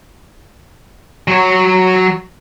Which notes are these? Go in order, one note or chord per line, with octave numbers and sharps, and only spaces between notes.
F#3 C#5